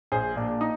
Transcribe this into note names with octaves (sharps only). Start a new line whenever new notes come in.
A#1 G#4 C5
A#2 D4
D#4